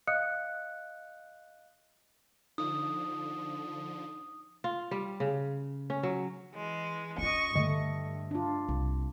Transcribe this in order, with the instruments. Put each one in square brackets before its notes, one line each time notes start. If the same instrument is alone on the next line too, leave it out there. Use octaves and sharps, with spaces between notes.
[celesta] D#5 F5 D#6 F#6 C#7
[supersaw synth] D3 F3 [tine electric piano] D#4 [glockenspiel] D#6
[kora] F4
G3
C#3
C#4
F#3
[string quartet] E3 G#3
[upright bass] C#4 F4 [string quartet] D#5 C#6
[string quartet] G2 [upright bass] D3 [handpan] A3 D#5
[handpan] D4 F4
[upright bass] C2